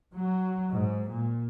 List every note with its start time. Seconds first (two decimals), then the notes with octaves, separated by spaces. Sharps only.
0.14 F#3
0.71 G#2
1.09 A#2